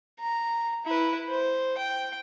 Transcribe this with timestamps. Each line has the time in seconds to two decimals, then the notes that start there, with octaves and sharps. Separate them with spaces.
0.20 A#5
0.86 E4 B4
1.29 C5
1.78 G5